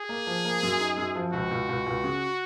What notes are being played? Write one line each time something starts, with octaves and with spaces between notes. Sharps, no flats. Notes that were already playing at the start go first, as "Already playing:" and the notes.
Already playing: G#4
A#3
F3
A#3
F#2
D#4
F#2
F3
C#2 F#4
C#2
C#2
C#2
C#3